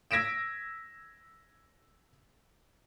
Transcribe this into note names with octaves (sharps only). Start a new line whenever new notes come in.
E6 G#6 A#6 B6 D7 E7